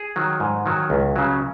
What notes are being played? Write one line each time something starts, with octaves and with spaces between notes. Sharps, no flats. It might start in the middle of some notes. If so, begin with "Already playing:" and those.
Already playing: G#4
D#3 F#3
G#2
D#3 F#3
C#2
C#3 F#3